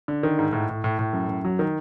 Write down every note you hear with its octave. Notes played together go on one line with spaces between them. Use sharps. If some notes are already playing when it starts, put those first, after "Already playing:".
D3
D#3
G#2
A2
A2
A2
A2
F#2
F#2
F#3
D#3